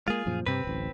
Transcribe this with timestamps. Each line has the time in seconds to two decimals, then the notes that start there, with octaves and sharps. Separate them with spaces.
0.08 G#3 A#3 F4 G#4
0.26 F#2 A#2 F3
0.46 G2 C3 C4 B4
0.64 D1 A1